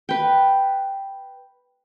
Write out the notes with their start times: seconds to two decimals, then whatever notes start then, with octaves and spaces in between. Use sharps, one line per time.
0.09 B4 G5